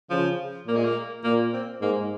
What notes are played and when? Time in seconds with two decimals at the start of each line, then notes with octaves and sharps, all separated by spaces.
0.10 C#3 F3
0.67 A#2 A#3
0.76 G#3
0.85 A#3
1.24 A#2 A#3
1.53 C4
1.81 G#2 A#3